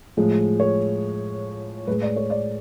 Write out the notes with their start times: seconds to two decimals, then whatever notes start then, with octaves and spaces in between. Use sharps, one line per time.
0.17 A2 F3 G#3
0.60 C#5
1.87 A2 G#3 B4
2.02 D5
2.16 C#5
2.30 D5